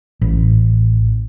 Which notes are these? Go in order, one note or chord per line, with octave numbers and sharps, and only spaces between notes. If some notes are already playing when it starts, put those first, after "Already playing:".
A1